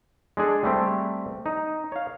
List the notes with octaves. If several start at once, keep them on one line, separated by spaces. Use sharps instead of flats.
G#3 D4 G#4 A4
G3 A3 C4 G4
D#4
C#5 F5